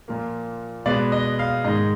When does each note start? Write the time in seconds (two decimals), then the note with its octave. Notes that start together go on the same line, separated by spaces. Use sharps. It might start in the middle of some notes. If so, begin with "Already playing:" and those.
0.08 A#2 F3 A#3
0.86 B2 G#3 B3 D5
1.12 D#5
1.39 F5
1.64 G#2 D#3 G#3 D#5